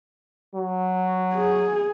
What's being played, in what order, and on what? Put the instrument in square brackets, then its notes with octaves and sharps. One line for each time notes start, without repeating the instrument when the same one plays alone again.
[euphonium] F#3
[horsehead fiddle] G#4